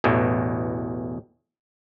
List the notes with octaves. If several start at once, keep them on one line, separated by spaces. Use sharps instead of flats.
A1 E2 B2